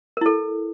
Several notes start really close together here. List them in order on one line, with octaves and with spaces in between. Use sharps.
A#4 E4 A4